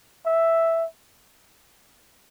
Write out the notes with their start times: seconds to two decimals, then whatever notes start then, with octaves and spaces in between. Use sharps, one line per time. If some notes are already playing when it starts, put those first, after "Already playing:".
0.26 E5